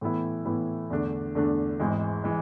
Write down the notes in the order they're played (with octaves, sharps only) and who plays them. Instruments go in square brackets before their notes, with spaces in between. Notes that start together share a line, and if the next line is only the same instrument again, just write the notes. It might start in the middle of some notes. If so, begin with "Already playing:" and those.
[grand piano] A2 E3 B3 E4
A2 E3 B3 E4
E2 D3 A3 D4
E2 D3 A3 D4
G#1 G#2 E3 G#3
E3 G#3